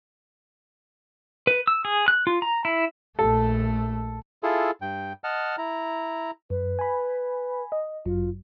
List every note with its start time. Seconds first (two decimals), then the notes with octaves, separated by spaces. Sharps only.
1.47 B4
1.67 E6
1.85 G#4
2.08 F#6
2.27 F4
2.42 A#5
2.65 E4
3.19 A#1 A3 A4
4.43 E4 F4 G#4 A4
4.82 G2 G5
5.24 D#5 F#5 A5 F6
5.58 E4 A#5
6.50 F#2 B4
6.79 G#5 B5
7.72 D#5
8.06 G1 F#2 F#3 F4